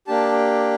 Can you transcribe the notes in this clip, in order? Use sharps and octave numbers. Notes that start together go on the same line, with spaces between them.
A#3 D4 G4 A5